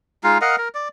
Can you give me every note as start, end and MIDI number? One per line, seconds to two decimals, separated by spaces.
0.24 0.38 56
0.24 0.38 63
0.24 0.38 65
0.24 0.38 77
0.41 0.56 70
0.41 0.56 75
0.41 0.56 77
0.41 0.56 78
0.58 0.68 70
0.75 0.88 74